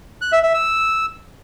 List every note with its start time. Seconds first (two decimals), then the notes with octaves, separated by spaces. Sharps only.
0.22 F#6
0.32 E5
0.43 E5
0.54 E6